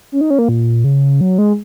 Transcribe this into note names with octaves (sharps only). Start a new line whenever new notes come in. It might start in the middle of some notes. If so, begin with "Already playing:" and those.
C#4
D#4
C#4
A#3
A#2
C#3
F#3
G#3